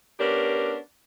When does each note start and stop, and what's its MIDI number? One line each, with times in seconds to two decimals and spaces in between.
0.20 0.77 59
0.20 0.77 61
0.20 0.77 62
0.20 0.77 67
0.20 0.77 70